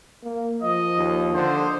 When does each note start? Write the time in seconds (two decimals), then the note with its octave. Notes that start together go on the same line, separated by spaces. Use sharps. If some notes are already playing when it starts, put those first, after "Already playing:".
0.24 A#3
0.63 F3 D#5
0.97 D#2
1.34 D3 A4 C5 D#5